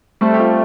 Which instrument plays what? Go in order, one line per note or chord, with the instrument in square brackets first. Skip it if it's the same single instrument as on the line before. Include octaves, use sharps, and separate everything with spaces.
[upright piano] G3 C4 [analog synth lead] A3
[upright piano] G4
C4 F4